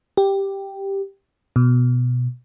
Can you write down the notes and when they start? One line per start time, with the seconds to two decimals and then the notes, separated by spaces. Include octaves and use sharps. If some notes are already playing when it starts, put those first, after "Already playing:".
0.17 G4
1.56 B2